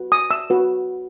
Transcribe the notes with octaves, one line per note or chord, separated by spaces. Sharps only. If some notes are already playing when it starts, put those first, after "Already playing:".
Already playing: F#4 B4
D#6
E6
F#4 B4